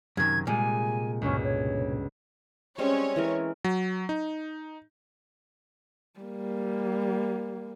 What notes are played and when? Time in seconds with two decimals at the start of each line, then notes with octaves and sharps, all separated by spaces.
0.17 F#2 C3 D#3 G#6
0.47 A#2 G3 G#3 G#5
1.22 C#2 G2 B2 C#4
1.43 C#5
2.78 G3 G#3 C4 C#4 C#5
3.16 E3 G#3 A#4
3.64 F#3
4.09 D#4
6.20 G3 A#3